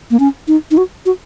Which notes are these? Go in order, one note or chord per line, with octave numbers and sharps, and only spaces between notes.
A#3
C#4
D#4
D#4
F#4
F#4